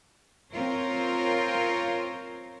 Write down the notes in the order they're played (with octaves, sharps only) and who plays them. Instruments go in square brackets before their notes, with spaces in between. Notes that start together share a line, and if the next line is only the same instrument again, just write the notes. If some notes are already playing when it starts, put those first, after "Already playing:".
[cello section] C4 F4 A#4 C5 C#5